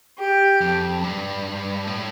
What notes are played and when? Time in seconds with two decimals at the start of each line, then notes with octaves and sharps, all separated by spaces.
0.19 G4
0.61 F2
1.04 G2
1.87 A2